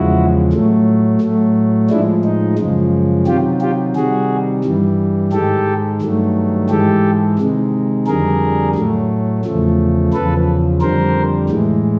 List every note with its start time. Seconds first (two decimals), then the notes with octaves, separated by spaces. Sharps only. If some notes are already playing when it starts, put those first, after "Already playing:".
Already playing: E2 C#3 F3 G#3 E4 F#4
0.53 A2 F#3 A3
1.21 A2 F#3 A3
1.90 A2 F3 G#3 D4 E4
2.24 D#4
2.58 F#2 C#3 F3 G#3
3.27 C3 D#3 F#3 F4 G4
3.61 F4 G4
3.95 C3 D#3 G3 F#4 G#4
4.65 G2 E3 G3
5.33 G#2 D#3 G#3 G4 A4
6.02 G2 D#3 F#3 A3
6.70 G#2 E3 G#3 G4 A4
7.38 C3 D#3 G#3
8.07 F2 D3 G3 G#4 A#4
8.75 A2 F#3 A3
9.44 E2 C#3 F3 A3
10.13 E2 C#3 F3 A4 B4
10.81 F2 D3 G3 A#4 C5
11.50 A2 E3 G#3